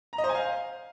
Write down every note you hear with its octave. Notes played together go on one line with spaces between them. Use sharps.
A#5
D#5
C5
G#5
F5